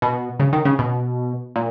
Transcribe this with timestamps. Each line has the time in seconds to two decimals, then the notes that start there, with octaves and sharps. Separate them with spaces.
0.02 B2
0.39 C#3
0.53 D#3
0.65 C#3
0.79 B2
1.56 A#2